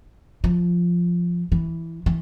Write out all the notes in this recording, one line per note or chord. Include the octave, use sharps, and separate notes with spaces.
F3
E3
E3